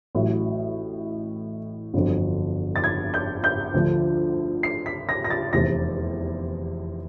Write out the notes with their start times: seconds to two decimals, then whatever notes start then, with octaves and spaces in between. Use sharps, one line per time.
0.15 A1 A2 F#3
1.94 G1 F2 D3 F#3
2.76 A6
2.84 G#6
3.14 G6
3.44 G6
3.74 D2 D3 F3
4.63 C7
4.86 B6
5.09 A#6
5.24 A#6
5.30 A6
5.53 F1 E2 C3 A#6